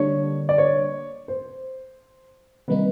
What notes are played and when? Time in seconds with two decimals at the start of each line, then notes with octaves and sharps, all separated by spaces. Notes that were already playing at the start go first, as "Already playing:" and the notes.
Already playing: D3 G3 A#3 D4 C#5
0.49 D5
0.58 C#5
1.28 C5
2.68 C3 D#3 G3 A#3 D#4 B4